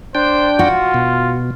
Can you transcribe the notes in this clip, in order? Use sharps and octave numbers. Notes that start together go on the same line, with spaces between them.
D4 C5 G5
F4 F#4
B2